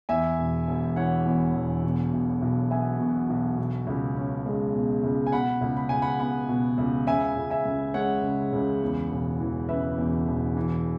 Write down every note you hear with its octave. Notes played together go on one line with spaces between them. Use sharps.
E2 E5 G#5
E1
E1
E3 C#5 F#5
E2
E1
B2
B1
B1
B3 E5 G#5
B2
B1
B2
C#2
C#4
G#3
B2
C#2
G#5
B2 F#5 B5
C#2
B5
C#2 G#5
F#5 B5
B3 F#5 B5
B2
C#2
C#3 E5 G#5
C#2
E5 G#5
C#2
G#3 C#5 F#5
C#3
C#2
E2
E1
E3
C#3 B4 E5
E2
E1
E3